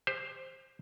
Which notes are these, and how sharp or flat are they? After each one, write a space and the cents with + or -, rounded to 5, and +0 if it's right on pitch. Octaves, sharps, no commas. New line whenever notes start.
G4 +40 C5 +5